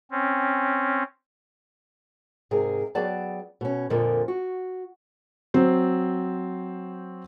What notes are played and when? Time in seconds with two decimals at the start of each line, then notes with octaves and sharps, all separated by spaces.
0.11 C4 C#4
2.51 G#2 C3 G#4 A#4
2.95 F#3 B3 G#4 D5 G5 A5
3.61 B2 C#4
3.90 F2 A#2 D3 F3 A#3
4.28 F#4
5.54 F#3 C4 C5